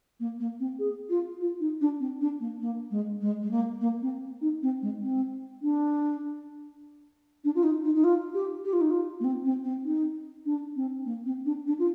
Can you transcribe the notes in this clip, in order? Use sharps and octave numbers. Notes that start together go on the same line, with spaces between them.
A#3
A#3
C4
G#4
F4
F4
D#4
D4
C4
D4
A#3
A#3
G#3
G#3
G#3
A#3
A#3
C4
D#4
C4
G#3
C4
D4
D4
F4
D#4
D#4
D#4
F4
G4
G4
F4
D#4
F4
A#3
C4
C4
C4
D#4
D4
C4
A#3
C4
D4
D4
F4